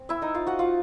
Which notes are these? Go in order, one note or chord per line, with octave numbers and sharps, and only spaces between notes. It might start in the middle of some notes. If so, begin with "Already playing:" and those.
Already playing: C4
E4 E5
D#4 D#5
F4 F5
F#4 F#5
F4 F5